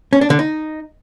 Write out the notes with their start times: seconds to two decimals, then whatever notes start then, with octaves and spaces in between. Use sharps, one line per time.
0.13 C#4
0.21 D4
0.30 D3
0.39 D#4